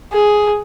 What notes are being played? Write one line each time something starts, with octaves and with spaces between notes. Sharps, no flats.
G#4